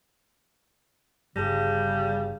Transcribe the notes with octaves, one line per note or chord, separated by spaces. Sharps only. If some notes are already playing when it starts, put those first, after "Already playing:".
G1 G2 C#3 G3 G#4 A5 A#6